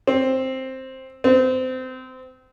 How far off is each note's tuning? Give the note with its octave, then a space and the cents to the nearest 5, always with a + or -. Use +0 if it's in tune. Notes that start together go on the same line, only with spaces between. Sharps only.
C4 +5
C4 -25